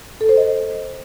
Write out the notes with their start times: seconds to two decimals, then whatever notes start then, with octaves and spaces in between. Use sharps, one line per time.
0.21 A4
0.29 C5
0.37 D#5